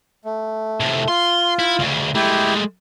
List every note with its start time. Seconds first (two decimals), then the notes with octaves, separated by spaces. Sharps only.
0.25 A3
0.80 A2 C3
1.08 F4 C6
1.59 E4
1.79 D2 C#3
2.15 G#3 A3 E4 G4